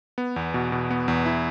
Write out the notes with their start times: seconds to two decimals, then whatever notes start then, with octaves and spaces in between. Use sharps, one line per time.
0.18 B3
0.36 E2
0.54 B2
0.72 B2
0.90 B3
1.08 E2
1.26 E4